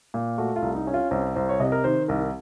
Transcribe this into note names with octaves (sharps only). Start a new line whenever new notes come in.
A#2
A3 F#4
F4
C2
D#4
C#4
F4
C2 C5
C2 C5
C#5
C3 D#5
A#4
D#3 C5
C2 A#4